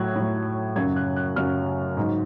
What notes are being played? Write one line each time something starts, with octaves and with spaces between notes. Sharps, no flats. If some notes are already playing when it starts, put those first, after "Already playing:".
Already playing: A2 F#3 F#6 G#6
A2 F#3
F#2 C#3 F#3 G#6
F#6
F#6
F#2 C#3 F#3 F6
G#2 F#3